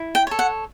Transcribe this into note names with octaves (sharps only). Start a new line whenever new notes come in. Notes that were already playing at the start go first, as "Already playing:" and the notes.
Already playing: E4
G5
A4 C#5
F#5